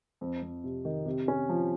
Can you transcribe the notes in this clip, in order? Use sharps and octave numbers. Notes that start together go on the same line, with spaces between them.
F2
F2
C3
D#3
C3
C#4
F3